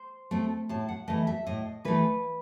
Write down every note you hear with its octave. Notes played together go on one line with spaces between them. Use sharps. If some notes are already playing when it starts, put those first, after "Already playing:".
Already playing: C5
A3 C4
A2 A5
F#5
E3 A3 D#5
E5
A2 D#5
E3 A3 B4